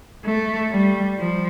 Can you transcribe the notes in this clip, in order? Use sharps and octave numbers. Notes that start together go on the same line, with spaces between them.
A3
G3
F3